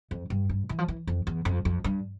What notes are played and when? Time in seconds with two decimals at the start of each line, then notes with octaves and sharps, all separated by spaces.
0.11 F2
0.30 G2
0.49 G2
0.69 E3
0.78 F3
0.88 E3
1.07 F2
1.27 E2
1.45 F2
1.65 F2
1.84 G2